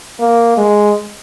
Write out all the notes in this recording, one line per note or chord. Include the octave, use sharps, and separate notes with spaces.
A#3
G#3